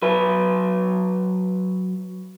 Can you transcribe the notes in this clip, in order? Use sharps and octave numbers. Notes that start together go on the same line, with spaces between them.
F#3 B4